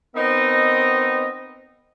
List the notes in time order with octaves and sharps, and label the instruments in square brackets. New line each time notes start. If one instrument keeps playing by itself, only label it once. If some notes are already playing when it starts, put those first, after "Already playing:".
[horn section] B3 C4 D#4 A#4 D#5